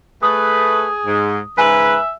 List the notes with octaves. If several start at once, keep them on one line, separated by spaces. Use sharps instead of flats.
A3 G#4 B4 D#6
G#2
G#2 C#3 B4 E5 G#5